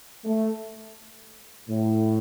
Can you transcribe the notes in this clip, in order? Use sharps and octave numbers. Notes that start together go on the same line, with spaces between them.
A3
A2